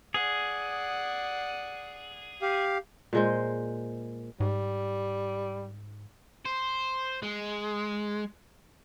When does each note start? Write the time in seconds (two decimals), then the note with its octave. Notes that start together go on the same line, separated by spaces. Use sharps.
0.14 G#4 D5 F#5
2.42 G4 F5
3.13 A#2 G#3 C5
4.40 G#2 G3
6.45 C5
7.23 G#3